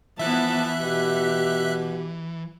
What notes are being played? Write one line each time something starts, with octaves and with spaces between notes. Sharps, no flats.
E3 F3 B3 E5 A5 F#6
B2 G4